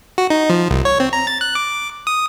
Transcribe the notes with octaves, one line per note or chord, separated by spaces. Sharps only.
F#4
D#4
F3
C2
C#5
C4
A#5
A6
F#6
D6
D#6